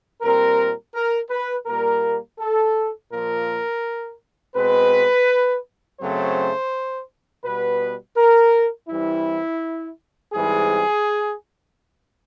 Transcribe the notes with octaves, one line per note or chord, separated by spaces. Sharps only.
A#2 G3 C4 A#4
A#4
B4
A#2 G3 A#3 A#4
A4
A#2 F3 A#3 A#4
B2 G#3 C4 B4
F#2 C#3 F#3 A3 C4 C5
B2 G3 B3 B4
A#4
G2 E3 G3 C4 E4
G#2 E3 G3 C4 G#4